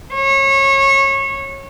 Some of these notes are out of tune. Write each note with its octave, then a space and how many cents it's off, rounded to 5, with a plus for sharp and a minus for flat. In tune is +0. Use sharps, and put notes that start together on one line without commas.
C#5 -25